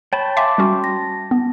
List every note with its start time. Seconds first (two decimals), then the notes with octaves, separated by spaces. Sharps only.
0.13 C#5 G5 A5 B5
0.37 E5 F5 G#5 C6 D6
0.58 G3 C#4 F#4
0.84 A#6
1.31 B3